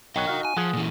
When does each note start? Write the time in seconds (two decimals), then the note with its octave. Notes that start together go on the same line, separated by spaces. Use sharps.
0.16 B1 C#5 D#5 F#5 G5
0.27 D#4 F#4 F5
0.45 G#5
0.57 F3 G#4 F#5
0.73 A#2 E3